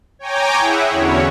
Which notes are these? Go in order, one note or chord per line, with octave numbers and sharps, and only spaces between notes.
C#5 G5 G#5 A#5 D6
E4 G#4 E5 F#5
E2 D3 C#4 E4 F#4 C#5